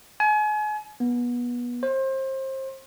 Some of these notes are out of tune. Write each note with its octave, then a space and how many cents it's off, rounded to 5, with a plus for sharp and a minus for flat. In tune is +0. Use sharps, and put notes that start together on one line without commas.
G#5 +35
B3 -25
C5 +30